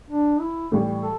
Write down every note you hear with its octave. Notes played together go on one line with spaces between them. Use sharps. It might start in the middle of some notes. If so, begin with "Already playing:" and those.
D4
E4
A2 E3 G3
A4